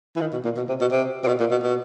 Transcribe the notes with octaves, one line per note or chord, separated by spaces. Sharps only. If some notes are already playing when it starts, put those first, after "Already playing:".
E3
D#3
B2
A#2
B2
C3
B2
C3
C3
B2
A#2
B2
B2